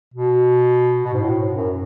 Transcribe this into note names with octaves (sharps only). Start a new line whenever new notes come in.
B2
B2
G#2
A2
G#2
F#2